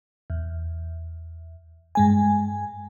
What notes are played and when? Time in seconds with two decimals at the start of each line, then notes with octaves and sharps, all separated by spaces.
0.30 E2
1.95 G2 G#3 G#5